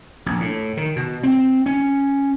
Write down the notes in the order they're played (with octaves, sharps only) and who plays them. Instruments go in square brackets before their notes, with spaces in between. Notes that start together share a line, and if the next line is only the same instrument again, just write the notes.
[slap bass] A#1
A2
D#3
B2
C4
C#4